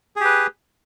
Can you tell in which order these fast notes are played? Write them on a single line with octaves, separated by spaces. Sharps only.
G#4 G4 B4